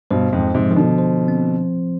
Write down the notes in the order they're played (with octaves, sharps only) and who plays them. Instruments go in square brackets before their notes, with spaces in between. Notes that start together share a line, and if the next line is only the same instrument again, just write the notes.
[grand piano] G2 B2 [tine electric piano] C5
[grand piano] F2 G#2
[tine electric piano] F3
[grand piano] G#2 C3
[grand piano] D#3 [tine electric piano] F3
[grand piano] B2 D3
[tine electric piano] C5
C4